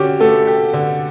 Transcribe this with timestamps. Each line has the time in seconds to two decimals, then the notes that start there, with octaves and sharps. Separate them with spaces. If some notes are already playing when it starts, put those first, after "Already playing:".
Already playing: D3 C#4 F#4 G4
0.20 A3 A4
0.47 G4
0.73 D3